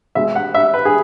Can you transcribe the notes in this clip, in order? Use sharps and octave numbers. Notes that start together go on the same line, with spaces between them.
B2 G#3 E5
F#5
E5
B4
G#4